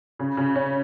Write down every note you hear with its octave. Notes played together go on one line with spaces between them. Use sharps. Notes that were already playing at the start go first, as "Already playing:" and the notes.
C#3
C#3
C#4